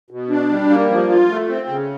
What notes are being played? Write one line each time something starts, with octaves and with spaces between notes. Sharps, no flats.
B2
D4
G3
A#3
F3
F4
A3
C4
C#3